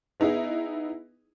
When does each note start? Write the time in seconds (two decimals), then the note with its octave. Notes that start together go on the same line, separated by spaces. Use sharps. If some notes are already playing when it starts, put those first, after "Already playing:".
0.20 B3 D#4 E4 G#4